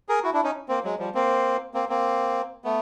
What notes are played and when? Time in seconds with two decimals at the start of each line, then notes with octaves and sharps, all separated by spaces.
0.09 G#4 A#4
0.24 E4 F#4
0.34 D4 E4
0.44 C#4 D#4
0.69 A#3 C4
0.84 F#3 G#3
0.99 F3 G3
1.15 A#3 C4
1.74 A#3 C4
1.89 A#3 C4
2.64 A3 B3